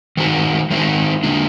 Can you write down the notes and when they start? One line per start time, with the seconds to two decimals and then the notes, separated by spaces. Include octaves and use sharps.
0.17 D#3 G#3 D#4 F#4
0.70 D#3 G#3 D#4 F#4
1.23 D3 G#3 D4